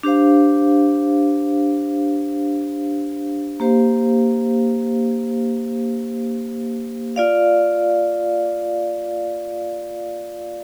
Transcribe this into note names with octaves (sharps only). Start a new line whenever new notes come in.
D4 G4 C5 F5
A#3 G4 C5 F5
F4 D5 F5